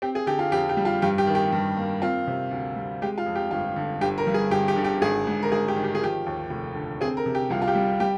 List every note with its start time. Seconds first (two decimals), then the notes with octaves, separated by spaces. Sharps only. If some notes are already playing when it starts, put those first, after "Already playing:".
0.02 C4 G4
0.15 G#4
0.26 D3 G4
0.39 F4
0.51 F2 G4
0.69 G4
0.77 G3
0.85 F4
1.02 G2 G4
1.18 G4
1.27 D#3
1.35 G4
1.52 G2
1.77 A#3
2.02 C4 F4
2.27 C3
2.51 D2
2.76 G3
3.02 G#3 G4
3.18 F4
3.26 F2
3.35 G4
3.51 G1 F4
3.76 D3
4.01 G1 G4
4.18 A#4
4.27 G2
4.34 G#4
4.51 G1 G4
4.68 G4
4.76 D3
4.84 G4
5.02 G#1 G#4
5.27 G#2
5.43 A#4
5.51 G#1 G#4
5.68 G4
5.76 D#3
5.84 G4
5.95 G#4
6.01 F3 G4
6.26 D#2
6.50 F1
6.75 D3
7.01 C4 G#4
7.17 A#4
7.26 C3
7.35 G4
7.50 C2 F4
7.62 F4
7.68 G4
7.75 G3
8.00 G3 G4